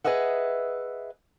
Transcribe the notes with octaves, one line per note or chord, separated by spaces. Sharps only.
G#4 B4 D#5 E5 F#5